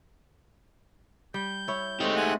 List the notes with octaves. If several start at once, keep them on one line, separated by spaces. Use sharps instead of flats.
G3 G6
E4 C#5
G#3 A3 C4 D#4 G4
F#5 G#5 F#6